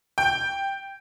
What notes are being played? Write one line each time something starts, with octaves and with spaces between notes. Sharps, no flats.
G5